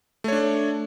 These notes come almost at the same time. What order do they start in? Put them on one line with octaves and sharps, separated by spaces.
A3 C#5 D4